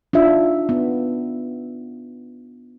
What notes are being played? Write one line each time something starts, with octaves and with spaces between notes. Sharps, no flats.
D4 D#4 F4 E5
B3